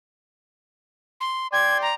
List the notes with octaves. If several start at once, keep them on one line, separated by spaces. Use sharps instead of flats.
C6
D5 G5 C6 G#6
A#5